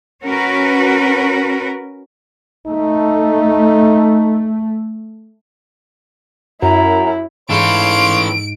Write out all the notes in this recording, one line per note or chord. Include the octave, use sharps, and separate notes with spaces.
C#4 F#4 A#4 B4
A3 D#4
F#2 E4 A#5
G#2 E3 A4 C#5 F5 C6 G6 D7